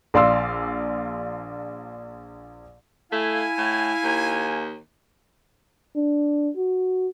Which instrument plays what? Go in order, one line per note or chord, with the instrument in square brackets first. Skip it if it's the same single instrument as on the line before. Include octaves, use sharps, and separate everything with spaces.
[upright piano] A#1 D5 F5 C6 E6
[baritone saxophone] A3 [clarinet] E4 [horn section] F5 G#5
[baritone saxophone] A2
D#2
[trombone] D4
F#4